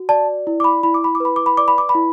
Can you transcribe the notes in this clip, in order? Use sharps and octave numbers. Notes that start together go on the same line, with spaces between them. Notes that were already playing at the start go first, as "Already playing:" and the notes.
Already playing: F#4
D5 A5
E4
D6
B5
E4 B5
D6
B5
D6
B4 B5
D6
B5
D5 D6
B5
D6
B5
E4